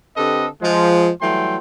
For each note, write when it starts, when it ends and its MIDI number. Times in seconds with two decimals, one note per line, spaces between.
0.17 0.47 50
0.17 0.47 60
0.17 0.47 67
0.17 0.47 69
0.17 0.47 71
0.17 0.47 75
0.62 1.10 53
0.62 1.10 56
1.21 1.58 52
1.21 1.58 54
1.21 1.58 55
1.21 1.58 57
1.21 1.58 79
1.21 1.58 84